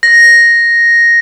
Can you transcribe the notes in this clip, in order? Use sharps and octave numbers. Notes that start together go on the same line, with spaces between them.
A#6